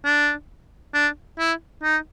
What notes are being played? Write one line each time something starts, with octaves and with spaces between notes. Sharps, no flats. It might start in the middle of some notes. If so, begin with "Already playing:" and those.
D4
D4
E4
D#4